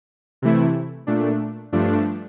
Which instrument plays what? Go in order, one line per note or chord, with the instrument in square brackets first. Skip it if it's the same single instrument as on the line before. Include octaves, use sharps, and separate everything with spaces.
[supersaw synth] C3 E3 A3 E4
A#2 A3 D4
G2 F3 A3 D4